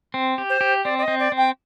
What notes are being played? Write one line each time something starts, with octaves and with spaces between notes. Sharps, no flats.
C4
G4
C5
G4
C4 D5
D5
D#5
C4
D5
C4
G5